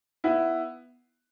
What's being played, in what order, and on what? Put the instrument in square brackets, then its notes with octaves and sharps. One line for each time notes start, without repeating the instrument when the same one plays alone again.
[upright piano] B3 E4